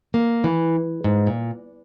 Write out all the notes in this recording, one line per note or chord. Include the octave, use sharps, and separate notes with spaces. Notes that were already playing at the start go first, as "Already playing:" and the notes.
A#3
E3
G#2
A#2